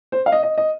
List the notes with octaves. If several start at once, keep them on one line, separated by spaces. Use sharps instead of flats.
C5
F5
D#5
D#5
D#5